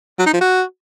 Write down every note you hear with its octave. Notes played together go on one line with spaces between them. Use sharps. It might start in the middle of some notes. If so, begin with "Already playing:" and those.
F#3
D#4
F3
F#4